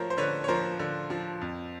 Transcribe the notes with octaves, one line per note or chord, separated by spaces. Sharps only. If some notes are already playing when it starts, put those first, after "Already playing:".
Already playing: F3 A3 A#4 C5 C#5
C5
D3 B4 C#5
C#5
F3 A#4 C5
D3
F3
F2